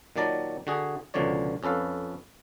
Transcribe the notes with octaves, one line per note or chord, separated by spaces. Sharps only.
A#2 D#3 F#3 D5 A5 A#5
D3 F#4 G#4
C#2 B2 D3 F3 C#5 D5
F2 C#4 A4 B4 F5